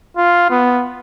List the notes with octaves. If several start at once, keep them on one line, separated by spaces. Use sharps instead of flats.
F4
B3